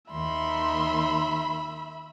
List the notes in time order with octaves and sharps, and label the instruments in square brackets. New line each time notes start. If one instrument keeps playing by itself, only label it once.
[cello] D#2 [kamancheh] D#4 C6 [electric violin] E5 B5